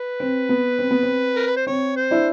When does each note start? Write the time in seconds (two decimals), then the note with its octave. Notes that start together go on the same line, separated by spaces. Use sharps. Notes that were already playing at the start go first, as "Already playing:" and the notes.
Already playing: B4
0.20 C4
0.49 B3
0.79 C4
0.91 B3
1.03 C4
1.36 A#4
1.47 B4
1.57 C5
1.67 C4 C#5
1.97 C5
2.11 D4 E4